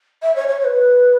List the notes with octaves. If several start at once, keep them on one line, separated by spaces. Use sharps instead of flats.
E5
C#5
C#5
C#5
B4